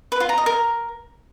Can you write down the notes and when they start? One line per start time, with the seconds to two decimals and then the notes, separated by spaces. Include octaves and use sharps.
0.12 B4
0.20 F4
0.29 A#5
0.38 D#5
0.46 A#4